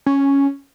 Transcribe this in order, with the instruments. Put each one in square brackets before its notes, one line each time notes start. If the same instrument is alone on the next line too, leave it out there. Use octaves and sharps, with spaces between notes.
[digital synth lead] C#4